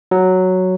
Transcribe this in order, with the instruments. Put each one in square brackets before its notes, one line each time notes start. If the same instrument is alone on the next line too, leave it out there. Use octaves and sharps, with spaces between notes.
[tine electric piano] F#3